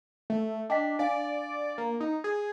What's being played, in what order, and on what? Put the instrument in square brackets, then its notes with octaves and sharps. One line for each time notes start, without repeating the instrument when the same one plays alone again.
[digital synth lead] A3
[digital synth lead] D4 [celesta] D#5 G5 B6
[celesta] D4 F5 G#5 [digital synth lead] D5
[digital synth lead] A#3
D#4
G#4